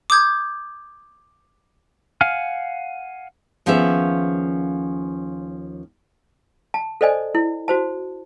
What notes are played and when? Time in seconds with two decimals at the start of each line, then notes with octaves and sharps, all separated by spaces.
0.10 D6 D#6 G6 G#6
2.21 F5 F#5 G#5 F6
3.66 D#2 F3 B3 C#4 G#4 E5
6.74 A5
7.01 A4 C5 D5 D#5 G#5
7.35 E4
7.68 F#4 C5 A5